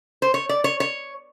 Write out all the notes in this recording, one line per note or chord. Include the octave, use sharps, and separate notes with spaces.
C5
C#5
D5
C#5
C#5